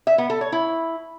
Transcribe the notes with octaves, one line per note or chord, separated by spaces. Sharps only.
E5
B3
A4
C#5
E4